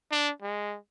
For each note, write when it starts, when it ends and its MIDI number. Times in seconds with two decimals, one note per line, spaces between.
0.11 0.31 62
0.42 0.77 56